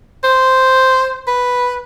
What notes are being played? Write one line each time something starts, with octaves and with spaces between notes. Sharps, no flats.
C5
B4